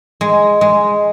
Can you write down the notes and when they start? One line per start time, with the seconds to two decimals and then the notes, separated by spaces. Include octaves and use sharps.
0.21 G#3
0.61 G#3